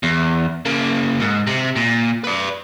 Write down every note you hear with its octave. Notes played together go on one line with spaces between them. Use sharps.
E2
C#3 A#3
G#2
C3
A#2
B4 D5